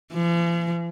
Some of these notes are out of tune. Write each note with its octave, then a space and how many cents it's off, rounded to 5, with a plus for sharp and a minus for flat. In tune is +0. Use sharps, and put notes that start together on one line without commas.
F3 -45